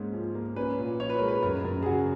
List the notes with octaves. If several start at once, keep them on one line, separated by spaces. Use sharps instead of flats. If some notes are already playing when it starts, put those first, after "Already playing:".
Already playing: G#2 A#3 C#4
F3
A#3
C#4 B4
A#2
F3 C#5
B4
G#3 A#4
B4
F#2 A#4
F#2
G#4
C#3 F#4